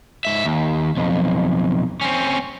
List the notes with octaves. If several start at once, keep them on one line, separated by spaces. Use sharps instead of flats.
G#2 E5
D#2
B1 F2
C4 C#4